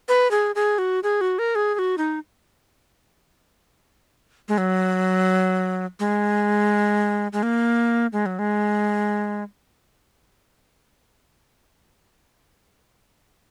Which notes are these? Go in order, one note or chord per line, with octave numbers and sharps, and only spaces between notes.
B4
G#4
G#4
F#4
G#4
F#4
A#4
G#4
G#4
F#4
D#4
G#3
F#3
G#3
G#3
A#3
G#3
F#3
G#3